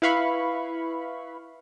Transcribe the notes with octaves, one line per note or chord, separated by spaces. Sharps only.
E4 B4 F5 B5 C#6